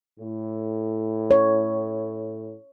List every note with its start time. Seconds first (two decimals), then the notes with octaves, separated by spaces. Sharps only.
0.19 A2
1.31 C#5